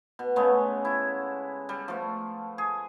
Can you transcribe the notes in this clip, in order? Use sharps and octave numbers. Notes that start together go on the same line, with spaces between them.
B2
C#3 G#3 A3 B3
E4
G3
F3 A3
G#4